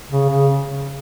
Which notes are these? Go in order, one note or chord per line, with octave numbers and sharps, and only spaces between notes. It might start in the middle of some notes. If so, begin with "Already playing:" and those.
C#3
C#3